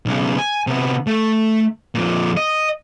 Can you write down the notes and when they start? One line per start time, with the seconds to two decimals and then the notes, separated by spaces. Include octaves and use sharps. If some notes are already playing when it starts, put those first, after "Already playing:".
0.06 B1 C#3
0.39 G#5
0.67 C3 B3
1.07 A3
1.95 F2 A#2
2.37 D#5